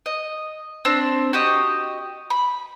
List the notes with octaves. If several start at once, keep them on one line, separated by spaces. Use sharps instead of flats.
D#5
C4 D4
F#4 G4 D#5
B5